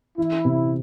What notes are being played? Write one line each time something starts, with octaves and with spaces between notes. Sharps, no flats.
E3 E4
C3